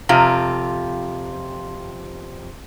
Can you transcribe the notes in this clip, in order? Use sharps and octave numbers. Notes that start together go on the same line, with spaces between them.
F2 C3 F4